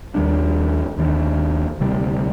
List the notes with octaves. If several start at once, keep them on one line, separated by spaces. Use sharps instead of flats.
D#2 D#3 G3 D4
D#2 D#3 G3 D4
D2 C3 G3